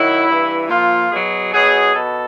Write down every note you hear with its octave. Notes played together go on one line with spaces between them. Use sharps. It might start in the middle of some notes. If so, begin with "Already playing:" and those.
Already playing: D#3 F#3 E4
G2 E3
A#2 F3 F4
B2 F#3 G#4
B2 F#3 G#4
B2 A4